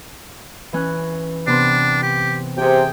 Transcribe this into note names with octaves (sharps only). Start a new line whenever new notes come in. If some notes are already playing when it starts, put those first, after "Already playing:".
E3 C#4 F#6
C3 B3 D4 C6
G4
C3 G4 G#4 G5